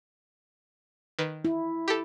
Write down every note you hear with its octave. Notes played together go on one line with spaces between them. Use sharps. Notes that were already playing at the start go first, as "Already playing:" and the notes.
D#3 B4
E4
G4 A4